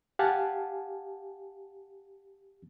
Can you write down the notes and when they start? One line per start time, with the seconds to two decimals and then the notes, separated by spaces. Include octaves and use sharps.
0.19 G4 F5 F#5 G#5 A5